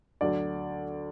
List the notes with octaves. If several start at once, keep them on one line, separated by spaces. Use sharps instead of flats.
D2 D3 F#3 D5